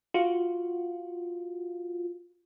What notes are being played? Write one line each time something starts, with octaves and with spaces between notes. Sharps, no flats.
F4 F#4